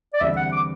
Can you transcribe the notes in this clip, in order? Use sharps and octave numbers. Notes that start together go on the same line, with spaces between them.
D5
E2 D3 G3 C4 E5
F#5
D6